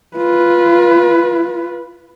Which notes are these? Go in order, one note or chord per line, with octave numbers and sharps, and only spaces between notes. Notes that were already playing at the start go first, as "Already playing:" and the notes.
F4 B4